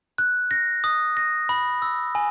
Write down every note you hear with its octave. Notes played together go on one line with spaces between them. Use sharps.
F#6
A#6
D#6
A#6
B5
E6
G#5